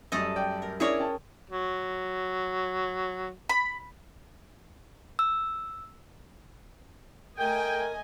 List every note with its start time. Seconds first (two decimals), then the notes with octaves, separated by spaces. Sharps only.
0.12 F#2 G3 A3 A4 D#5
0.36 D5 G5
0.62 A#4
0.80 C#4 D4 E4 G#4 A#4 C#5 D5
0.99 C#4 G5 A5
1.50 F#3
3.49 B5
5.19 E6
7.38 A3 A#4 D#5 G5 G#5